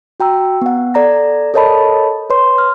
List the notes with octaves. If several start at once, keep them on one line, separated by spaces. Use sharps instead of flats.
F#4 G5 A#5 E6
B3 F#5
A4 D5 A#5 A#6
A4 A#4 C#5 D#5 A5 B5
B4 C#5 C6
F6